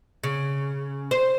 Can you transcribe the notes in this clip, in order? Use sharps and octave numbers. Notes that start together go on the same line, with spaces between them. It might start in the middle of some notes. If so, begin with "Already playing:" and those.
C#3
C5